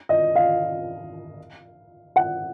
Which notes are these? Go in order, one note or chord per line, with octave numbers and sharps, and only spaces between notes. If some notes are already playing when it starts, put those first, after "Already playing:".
D#5
F5
F#5